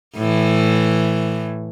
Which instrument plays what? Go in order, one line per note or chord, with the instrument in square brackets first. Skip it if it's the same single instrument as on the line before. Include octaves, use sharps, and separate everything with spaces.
[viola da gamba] A2 E3